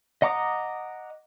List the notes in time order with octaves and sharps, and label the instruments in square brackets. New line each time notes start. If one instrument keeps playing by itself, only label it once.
[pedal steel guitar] D#5 F#5 A#5 D6 D#6